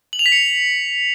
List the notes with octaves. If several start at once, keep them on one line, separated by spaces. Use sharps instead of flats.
F#7
F7
B6
C#7